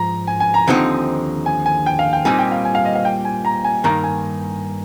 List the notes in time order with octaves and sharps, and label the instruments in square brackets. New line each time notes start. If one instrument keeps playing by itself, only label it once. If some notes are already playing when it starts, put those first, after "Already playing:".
Already playing: [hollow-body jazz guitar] G#2 F3 [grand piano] A#5
[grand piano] G#5
G#5
A#5
[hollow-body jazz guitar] D#2 D3 F3 C4 D#4
[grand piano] G#5
G#5
G5
F5
G5
[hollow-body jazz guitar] A#2 G3 C4 D#4 [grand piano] G#5
[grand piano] G5
F5
G#5
F5
D#5
F5
G5
G#5
A#5
G#5
[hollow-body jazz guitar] G2 D#3 A#3 [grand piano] A#5
[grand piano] G#5